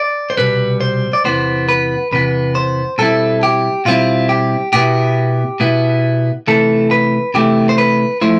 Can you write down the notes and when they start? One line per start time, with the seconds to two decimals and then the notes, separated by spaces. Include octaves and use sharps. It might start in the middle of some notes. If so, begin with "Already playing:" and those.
Already playing: D5
0.30 C5
0.37 C2 B2 G3 B4
0.81 C5
1.13 D5
1.24 E2 C3 E3 B3 C5
1.69 B4
2.11 E2 C3 E3 B3 B4
2.55 C5
2.98 B2 G3 C4 E4 A4
3.43 G4
3.85 B2 G3 C4 E4 F4
4.29 G4
4.73 B2 B3 E4 G4
5.60 B2 B3 E4
6.47 C3 E3 A3 A4
6.91 B4
7.34 C3 E3 A3 G4
7.69 C5
7.78 B4
8.21 F3 A3 E4 C5